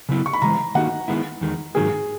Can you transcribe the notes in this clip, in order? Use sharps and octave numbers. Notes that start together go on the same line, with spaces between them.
C#3 F#3 B3 E4
C#6
B5
C#3 E3 G#3 A#5
D#3 A#3 D#4 F#4 F#5
D#3 G#3 B3 E4
E2 D#3 G#3
G#2 D#3 F#3 A#3 G#4